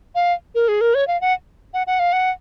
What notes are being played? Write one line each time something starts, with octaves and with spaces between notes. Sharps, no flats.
F5
A#4
G#4
A#4
C#5
F5
F#5
F#5
F#5
F5
F#5